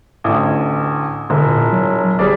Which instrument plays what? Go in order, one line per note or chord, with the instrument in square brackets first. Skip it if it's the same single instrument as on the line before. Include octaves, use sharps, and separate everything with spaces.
[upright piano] A1 D2
[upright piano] E1 [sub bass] D3
[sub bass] A#2
F#3
[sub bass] G1 [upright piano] G3 G#4 D5